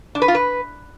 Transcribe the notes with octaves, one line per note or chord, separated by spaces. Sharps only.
D4
B4
F4
B4